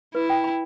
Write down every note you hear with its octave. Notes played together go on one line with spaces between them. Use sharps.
E4 B4
G5
B5